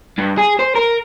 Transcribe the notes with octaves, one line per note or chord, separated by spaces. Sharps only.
G2
G#4
C5
A#4